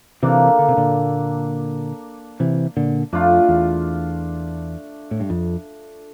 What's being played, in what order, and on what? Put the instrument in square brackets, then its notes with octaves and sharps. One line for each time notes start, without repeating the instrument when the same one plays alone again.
[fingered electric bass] C3 E3 [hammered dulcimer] A#3 D4 A4
[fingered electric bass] D3
C3
A#2 D3
C3 E3
A#2 D3
[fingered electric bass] F2 [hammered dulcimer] A3 D4 F4
[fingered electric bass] E2
A2
G2
F2